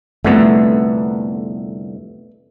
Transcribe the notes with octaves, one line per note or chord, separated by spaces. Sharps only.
C2 F2 D3 A3 B3